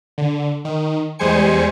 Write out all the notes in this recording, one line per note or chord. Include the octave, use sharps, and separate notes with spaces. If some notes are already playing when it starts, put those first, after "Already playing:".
D3
D#3
E2 G3 G#3 C5 G#5 C#7